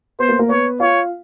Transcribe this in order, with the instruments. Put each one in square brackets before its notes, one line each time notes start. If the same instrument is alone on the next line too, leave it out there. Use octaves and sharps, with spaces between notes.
[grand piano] B3 B4 [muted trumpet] C5
[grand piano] A#3 A#4
A#3 A#4
[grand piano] B3 B4 [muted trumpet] C#5
[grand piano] F4 F5 [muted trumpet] C#5